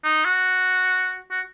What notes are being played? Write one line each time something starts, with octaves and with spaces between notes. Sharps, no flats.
D#4
F#4
F#4